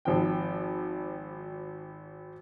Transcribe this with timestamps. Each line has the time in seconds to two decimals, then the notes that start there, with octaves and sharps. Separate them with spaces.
0.05 G#1 F3 G5